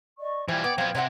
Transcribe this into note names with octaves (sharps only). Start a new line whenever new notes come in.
D5 D#5 C#6
E3 F3 G3 G5 G#6
B3 D5
F3 F#3 B3 C4
C3 C4 D4 F#5